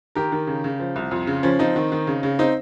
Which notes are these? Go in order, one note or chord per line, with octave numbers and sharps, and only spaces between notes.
D#3 G4 A#4
D#3
C#3
C#3
F3
C2
F2
C#3
F3 C#4
F3 C4 D#4
D#3
D#3
C#3
C#3
C4 D#4